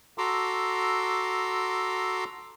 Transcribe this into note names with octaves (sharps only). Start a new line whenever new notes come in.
F#4 A4 A#5 C6 D6 E6